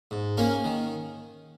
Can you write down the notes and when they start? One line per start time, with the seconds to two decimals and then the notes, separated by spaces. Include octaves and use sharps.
0.11 G#2
0.37 A#3 C#4 A#4
0.64 D#3